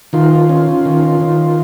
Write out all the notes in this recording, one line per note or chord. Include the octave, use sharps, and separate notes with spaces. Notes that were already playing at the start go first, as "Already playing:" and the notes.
D#3 F4
C#4
D#3
D#3